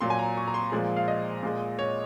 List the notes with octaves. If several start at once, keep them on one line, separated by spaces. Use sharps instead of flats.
A#2 F#3 C6
G#5
A#5
C#6
A#5
C6
A#2 F3 G#3
F5
D#5
A#2 G#3
C#5